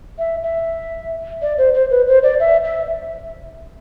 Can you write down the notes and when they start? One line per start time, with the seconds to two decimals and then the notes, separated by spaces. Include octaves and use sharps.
0.19 E5
0.43 E5
1.42 D5
1.58 C5
1.74 C5
1.91 B4
2.08 C5
2.23 D5
2.40 E5
2.64 E5